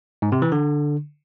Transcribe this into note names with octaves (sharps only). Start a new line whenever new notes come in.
G#2
C3
E3
D3